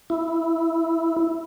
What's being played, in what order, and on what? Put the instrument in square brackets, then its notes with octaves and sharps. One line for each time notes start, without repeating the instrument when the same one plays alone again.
[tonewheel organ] E4